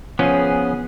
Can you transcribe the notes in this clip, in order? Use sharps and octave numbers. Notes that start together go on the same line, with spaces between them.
F3 B3 C#4 G#4